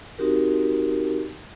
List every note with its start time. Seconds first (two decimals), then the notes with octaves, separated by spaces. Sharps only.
0.19 C4 D#4 F#4 G4 A#4